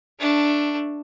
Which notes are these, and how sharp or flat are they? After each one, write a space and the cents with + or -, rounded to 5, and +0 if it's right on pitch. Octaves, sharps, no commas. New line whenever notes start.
A3 +10 D4 +0